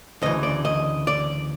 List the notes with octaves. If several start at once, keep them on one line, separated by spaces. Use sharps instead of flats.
D2 C#3 E3 D#5
D5
D#5
D5